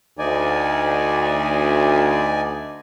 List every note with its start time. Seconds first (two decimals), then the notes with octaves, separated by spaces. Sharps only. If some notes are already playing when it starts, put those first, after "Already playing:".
0.19 D2 D#4 D5 G#5